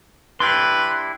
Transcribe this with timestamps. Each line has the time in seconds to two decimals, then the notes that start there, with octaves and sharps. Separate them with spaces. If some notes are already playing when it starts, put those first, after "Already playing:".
0.40 D4 E4 G4 B4 C6